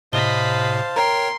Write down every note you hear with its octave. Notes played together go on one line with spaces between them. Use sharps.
A2 C3 C5 D#5 F5 A5 B5 G7
A#4 C#5 G5 A#5 C6